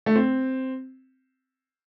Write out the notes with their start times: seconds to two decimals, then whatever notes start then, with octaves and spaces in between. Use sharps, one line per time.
0.06 A3
0.16 C4